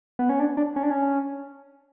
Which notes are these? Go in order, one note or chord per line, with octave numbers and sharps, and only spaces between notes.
B3
C#4
D4
D4
C#4
D4
C#4